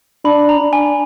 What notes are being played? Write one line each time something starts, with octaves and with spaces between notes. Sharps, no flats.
D4 B5
A#5
D4
G#5